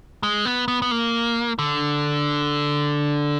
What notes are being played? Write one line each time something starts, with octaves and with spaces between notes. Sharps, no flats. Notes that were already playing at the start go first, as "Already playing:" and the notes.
G#3
B3
B3
B3
A#3
D3